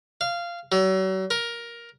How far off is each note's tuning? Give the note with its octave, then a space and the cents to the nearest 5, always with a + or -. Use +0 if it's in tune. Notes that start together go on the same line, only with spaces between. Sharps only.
F5 -15
F#3 +40
A#4 +10